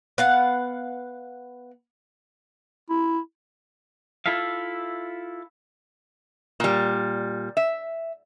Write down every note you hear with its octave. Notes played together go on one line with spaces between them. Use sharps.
B3 F5 F#5
E4
E4 F4 A4 E5 F5
A#2 G3
E5